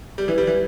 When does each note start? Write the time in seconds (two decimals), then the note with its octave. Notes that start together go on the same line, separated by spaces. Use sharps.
0.18 G3
0.28 E3
0.38 G3
0.47 E3